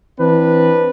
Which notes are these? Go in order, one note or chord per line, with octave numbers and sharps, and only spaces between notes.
E3 C4 D4 B4